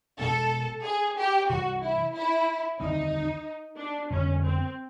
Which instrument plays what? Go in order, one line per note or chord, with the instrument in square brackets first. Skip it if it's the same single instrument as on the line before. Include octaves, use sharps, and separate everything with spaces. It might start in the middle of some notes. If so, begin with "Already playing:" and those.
[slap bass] B2 G#3 B3 D4 [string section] A4
[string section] G#4
G4
[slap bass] C3 E3 G3 [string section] F#4
[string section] E4
E4
[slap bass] D#2 D3 G3 C4 [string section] D#4
[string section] D4
[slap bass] F2 D3 G3 B3 [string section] C#4
[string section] C4